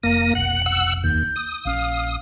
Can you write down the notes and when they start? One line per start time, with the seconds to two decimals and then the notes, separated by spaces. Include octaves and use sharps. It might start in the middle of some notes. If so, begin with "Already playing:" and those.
0.03 F1 A#3 A#6 D#7
0.35 F1 B1 F#5 F#7
0.66 F#5 E6
1.04 D#2 G6
1.36 D#6
1.65 A#1 C#4 F5